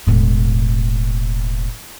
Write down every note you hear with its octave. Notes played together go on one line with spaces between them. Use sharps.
E1 A2